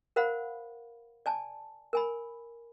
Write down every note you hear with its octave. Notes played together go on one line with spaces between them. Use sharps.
A#4 C5 F5 F#5 B5
D5 G#5 A5
A#4 G#5 B5